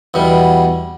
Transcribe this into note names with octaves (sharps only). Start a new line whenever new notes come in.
E2 B2 G3